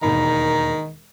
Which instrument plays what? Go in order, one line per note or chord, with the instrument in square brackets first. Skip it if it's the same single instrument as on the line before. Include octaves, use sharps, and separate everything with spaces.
[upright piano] E1 D#2 B5 [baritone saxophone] D#3 [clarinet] A#5